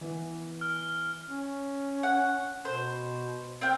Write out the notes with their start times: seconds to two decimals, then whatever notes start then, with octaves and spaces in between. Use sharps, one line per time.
0.01 E3 B3
0.61 F6
1.29 C#4
2.03 F#5
2.65 B2 C5
3.61 C4 F5 G5